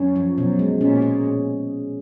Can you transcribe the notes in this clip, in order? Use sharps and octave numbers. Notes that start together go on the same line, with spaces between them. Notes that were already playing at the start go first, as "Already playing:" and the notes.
Already playing: F#2 C#4
F3
F#2 B2
G#3
A#2 C#4
G#4
A#2